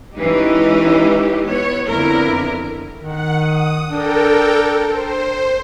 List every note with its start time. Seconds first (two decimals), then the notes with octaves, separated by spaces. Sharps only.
0.15 E3 G#3 C#4 D#4 G4
1.43 B3 C#5
1.89 F2 D3 B3 E4 A#4
3.03 D#3 F#5
3.36 D#6
3.89 D4 A4 A#4 G5
4.87 C5